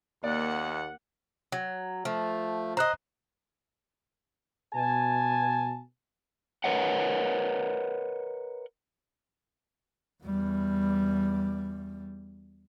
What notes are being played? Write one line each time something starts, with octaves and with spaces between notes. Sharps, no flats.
D#2 A#3 D5 F#5
F#3
F3 A3
C5 D#5 A#5 F#6
B2 G#5 A5
A#4 B4 C#5 D#5 F#5
E2 G3